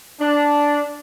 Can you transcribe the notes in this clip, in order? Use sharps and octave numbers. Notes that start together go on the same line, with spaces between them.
D4